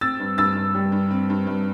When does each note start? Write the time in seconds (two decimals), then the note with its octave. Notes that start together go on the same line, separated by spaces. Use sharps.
0.01 C4 E6 A6
0.20 G2
0.38 G2 E6 A6
0.56 G2
0.75 G3
0.92 G2
1.11 C4
1.30 G2
1.47 G2